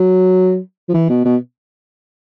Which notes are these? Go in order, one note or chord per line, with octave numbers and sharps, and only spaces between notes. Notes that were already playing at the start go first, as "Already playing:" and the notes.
Already playing: F#3
F3
E3
B2
B2